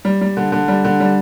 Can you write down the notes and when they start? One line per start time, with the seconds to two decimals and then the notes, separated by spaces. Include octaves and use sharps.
0.05 G3
0.21 G3
0.37 D3
0.52 D3
0.68 G3
0.84 D3
1.00 G3